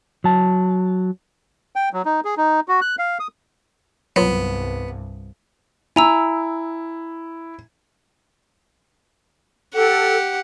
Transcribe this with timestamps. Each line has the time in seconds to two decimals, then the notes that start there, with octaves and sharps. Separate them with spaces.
0.24 F#3 A5
1.76 G5
1.93 F#3
2.05 D#4
2.25 G#4
2.37 D#4
2.68 F#4
2.81 F#6
2.99 F5
3.20 D#6
4.16 C2 G2 F#3 B3 F4
5.96 E4 G#5 A#5 E6
9.74 G4 A4 F#5